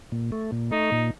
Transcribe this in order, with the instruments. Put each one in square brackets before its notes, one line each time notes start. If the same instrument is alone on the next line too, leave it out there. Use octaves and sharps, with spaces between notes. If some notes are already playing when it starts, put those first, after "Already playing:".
[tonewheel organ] A#2
A3
A#2
[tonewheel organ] A3 [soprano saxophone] D#4
[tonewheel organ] A#2